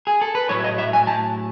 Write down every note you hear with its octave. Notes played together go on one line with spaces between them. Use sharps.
G#4
A4
B4
A2 F#3 A3 E4 C#5
D#5
E5
G#5
A5